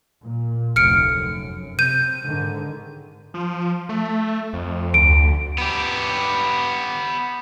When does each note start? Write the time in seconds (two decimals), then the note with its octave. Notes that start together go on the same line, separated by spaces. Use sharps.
0.24 A#2
0.76 F1 D2 F6 C#7 D7
1.13 F#2
1.79 C3 G6 D#7
2.23 G#2 D3 D#3
3.34 F3
3.89 A3
4.53 F2
4.94 D2 D7
5.58 B3 G4